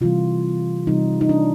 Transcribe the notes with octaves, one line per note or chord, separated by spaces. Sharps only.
C3 E3 G3 F4
C3 E3 G3 D#4
D#4
D4